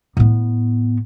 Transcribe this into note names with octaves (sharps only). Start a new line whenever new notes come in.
A2 B3